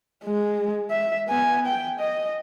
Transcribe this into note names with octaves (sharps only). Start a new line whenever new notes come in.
G#3
E5
B3 G#5
G5
D#5